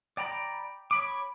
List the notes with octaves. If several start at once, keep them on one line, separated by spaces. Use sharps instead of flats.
D5 G5 A#5 B5
C#5 B5 D6